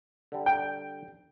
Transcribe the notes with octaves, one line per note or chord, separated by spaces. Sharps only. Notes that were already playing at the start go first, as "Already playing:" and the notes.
D3 G3
G5